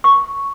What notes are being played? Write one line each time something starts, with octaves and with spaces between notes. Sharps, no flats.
C#6